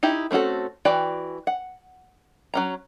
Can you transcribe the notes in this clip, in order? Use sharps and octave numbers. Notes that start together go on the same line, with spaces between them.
D#4 E4 G4
A3 C4 C#4 F#4 A4
E3 F#4 D5 G5
F#5
F#3 C#4 A#5